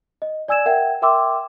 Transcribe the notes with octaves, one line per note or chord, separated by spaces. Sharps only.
D#5
D5 G#5 E6 G#6 E7
A#4 E5 F#5 G5 G#6
A#4 E5 G5 C6 D6 E6